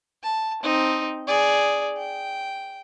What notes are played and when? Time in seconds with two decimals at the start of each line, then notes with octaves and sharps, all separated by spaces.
0.23 A5
0.63 C4 D#4
1.27 G#4 D5
1.97 G5